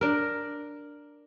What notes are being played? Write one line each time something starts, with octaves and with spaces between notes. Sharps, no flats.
D4 A#4